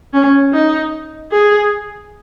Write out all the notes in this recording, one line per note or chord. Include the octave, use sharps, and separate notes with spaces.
C#4
D#4
G#4